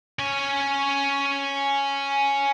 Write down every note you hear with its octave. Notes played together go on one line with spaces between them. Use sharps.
C#4 C#5